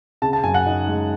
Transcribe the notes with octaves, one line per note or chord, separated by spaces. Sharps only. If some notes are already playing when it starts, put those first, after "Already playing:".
C#3 A5
A5
F#2 G#5
F#5
D#4
G#3